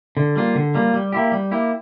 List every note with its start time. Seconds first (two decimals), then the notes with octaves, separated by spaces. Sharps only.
0.17 D3
0.36 G3 A#3 F4
0.55 D3
0.75 G3 A#3 F4
0.94 G3
1.12 A#3 E4 G4
1.32 G3
1.52 A#3 E4 G4